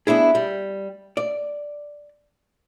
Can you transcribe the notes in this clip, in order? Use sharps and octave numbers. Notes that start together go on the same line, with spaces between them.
B3 D4 E4 G#4
G3
D5